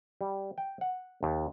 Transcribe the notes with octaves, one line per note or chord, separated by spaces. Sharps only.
G3
G5
F#5
D#2